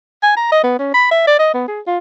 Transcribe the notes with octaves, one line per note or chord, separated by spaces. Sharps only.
G#5
A#5
D#5
B3
C#4
B5
E5
D5
D#5
B3
G#4
F4